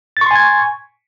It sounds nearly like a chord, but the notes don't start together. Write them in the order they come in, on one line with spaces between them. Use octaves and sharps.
A6 C#6 C6 G#5 G#6